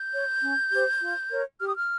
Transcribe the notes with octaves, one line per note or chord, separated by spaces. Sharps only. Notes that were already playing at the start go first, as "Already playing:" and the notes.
Already playing: G6
C#5
C#4
G4 C5
F4
A#4 C#5
G4 F6
D#6
F6